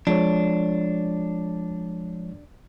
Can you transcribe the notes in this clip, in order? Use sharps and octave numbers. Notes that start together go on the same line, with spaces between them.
F3 G#3 D4 C#5